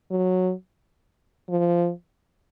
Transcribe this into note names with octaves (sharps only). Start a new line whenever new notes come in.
F#3
F3